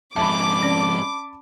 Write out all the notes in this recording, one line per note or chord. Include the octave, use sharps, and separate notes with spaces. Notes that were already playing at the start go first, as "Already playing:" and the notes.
F2 G#2 E5 A5 B5 D6
C#4 D5